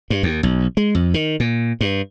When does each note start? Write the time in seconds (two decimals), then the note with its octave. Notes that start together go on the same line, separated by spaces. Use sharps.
0.10 G2
0.23 D#2
0.43 B1
0.77 G#3
0.95 F2
1.14 D#3
1.40 A#2
1.81 G2